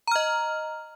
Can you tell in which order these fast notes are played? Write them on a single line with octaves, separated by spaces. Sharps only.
A#5 F6 D#5